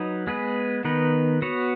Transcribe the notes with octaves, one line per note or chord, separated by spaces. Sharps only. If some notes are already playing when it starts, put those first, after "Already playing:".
Already playing: F#3 D#4 B4
G#3 B3 G#4 B4
D#3 B3 D#4 B4
B3 F#4 C#5